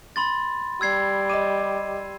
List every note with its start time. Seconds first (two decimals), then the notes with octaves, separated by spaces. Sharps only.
0.16 B5 C6 A6
0.81 G3 E6 G#6 C7
1.30 D#5 D6 D#7 E7